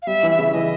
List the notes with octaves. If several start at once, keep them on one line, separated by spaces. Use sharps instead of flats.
F5
G3 E5
E3
E5
C#3
E3 D#5